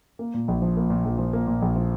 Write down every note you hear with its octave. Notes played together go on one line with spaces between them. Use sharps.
A#3
A#2
A#1
F3
A#3
A#2
A#1
F3
A#3
A#2
A#1
F3